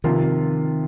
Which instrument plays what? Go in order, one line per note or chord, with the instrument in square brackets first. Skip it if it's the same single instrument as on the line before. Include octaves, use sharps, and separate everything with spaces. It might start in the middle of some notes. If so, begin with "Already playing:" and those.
[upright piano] C3 F3 A#3 F4 A#4 [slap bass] D#3